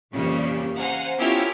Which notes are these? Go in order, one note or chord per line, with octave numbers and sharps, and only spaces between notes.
F2 A#2 C#3 E3 G3 A#3
C5 F5 F#5 G#5 A#5
B3 C#4 E4 F4 G4 A#4